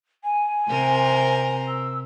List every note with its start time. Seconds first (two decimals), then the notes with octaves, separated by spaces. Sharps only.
0.23 G#5
0.69 C3 A#4 C5
1.68 E6